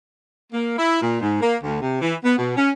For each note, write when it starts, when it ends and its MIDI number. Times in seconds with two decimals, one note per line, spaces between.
0.53 0.73 58
0.77 1.00 64
1.01 1.18 46
1.21 1.40 44
1.41 1.56 58
1.62 1.79 38
1.81 1.97 48
2.01 2.15 52
2.24 2.35 59
2.37 2.55 47
2.56 2.69 61